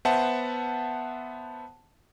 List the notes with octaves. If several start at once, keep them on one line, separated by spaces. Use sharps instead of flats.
B3 C5 E5 F#5 A5